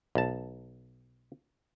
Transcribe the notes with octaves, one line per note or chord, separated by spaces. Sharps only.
B1 A5